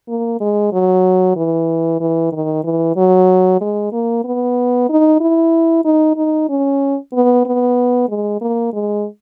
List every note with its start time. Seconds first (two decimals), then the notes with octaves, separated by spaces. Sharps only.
0.08 A#3
0.40 G#3
0.72 F#3
1.36 E3
2.00 E3
2.32 D#3
2.64 E3
2.96 F#3
3.61 G#3
3.92 A#3
4.24 B3
4.89 D#4
5.21 E4
5.85 D#4
6.17 D#4
6.49 C#4
7.13 B3
7.45 B3
8.09 G#3
8.41 A#3
8.73 G#3